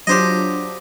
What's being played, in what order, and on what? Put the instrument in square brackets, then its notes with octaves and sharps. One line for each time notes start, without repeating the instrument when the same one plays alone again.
[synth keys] F#3 D4 F4 [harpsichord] G4 C5 D#5